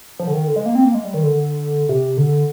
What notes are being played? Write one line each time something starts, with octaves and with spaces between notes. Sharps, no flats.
F3
D3
D#3
D3
G#3
A#3
C4
A#3
G#3
G3
D#3
D3
C3
D3